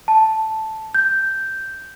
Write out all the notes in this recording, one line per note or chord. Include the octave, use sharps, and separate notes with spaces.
A5
G6